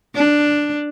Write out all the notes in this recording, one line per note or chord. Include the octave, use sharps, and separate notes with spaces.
D4